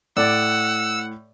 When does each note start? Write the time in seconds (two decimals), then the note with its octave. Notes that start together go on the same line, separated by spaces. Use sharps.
0.17 A2 D5 F#5 E6